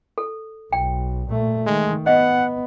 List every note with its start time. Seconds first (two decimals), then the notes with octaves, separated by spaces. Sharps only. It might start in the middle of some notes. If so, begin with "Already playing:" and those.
0.18 A4
0.72 B1 G5
1.29 A#2 A3
1.67 D#3 G#3
2.07 B3 D#5 F#5